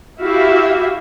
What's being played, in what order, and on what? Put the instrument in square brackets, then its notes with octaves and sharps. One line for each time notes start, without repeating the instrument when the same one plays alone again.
[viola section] E4 F#4 G4 E5 F5